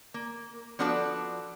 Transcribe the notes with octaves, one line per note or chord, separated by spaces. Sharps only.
A#3
F3 B3 D4 F#4 A4 D5